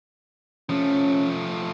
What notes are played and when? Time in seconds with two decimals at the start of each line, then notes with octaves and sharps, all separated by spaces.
0.70 F3 A3 C#4